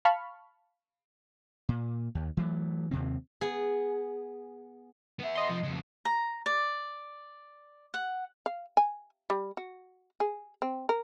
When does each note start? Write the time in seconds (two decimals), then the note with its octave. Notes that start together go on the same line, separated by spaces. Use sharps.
0.05 F5 A5 B5 C#6 F6
1.69 A#2
2.15 D#2
2.37 E3 F#3 A3
2.91 D#2 C3 C4
3.41 B3 G#4
5.19 B3 E5
5.35 D#5 C6
5.49 C3 F3
5.63 F2 C#3
6.05 A#5
6.46 D5
7.94 F#5
8.46 F5
8.77 G#5
9.30 G3
9.57 F#4
10.20 G#4
10.62 C4
10.89 A#4